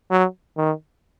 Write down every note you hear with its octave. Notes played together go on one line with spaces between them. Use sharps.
F#3
D#3